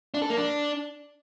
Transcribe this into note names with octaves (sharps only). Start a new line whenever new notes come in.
D4
A4
A#3
D4